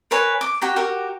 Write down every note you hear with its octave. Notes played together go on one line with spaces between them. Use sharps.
A#4 B4 C#5 G#5
D6
F#4 G4 A#5
F#4 G4 A#4